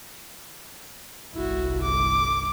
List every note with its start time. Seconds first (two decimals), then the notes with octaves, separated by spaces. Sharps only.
1.33 G1 C2 E4 F#4
1.82 D6